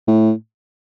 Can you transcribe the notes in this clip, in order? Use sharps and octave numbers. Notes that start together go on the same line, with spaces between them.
A2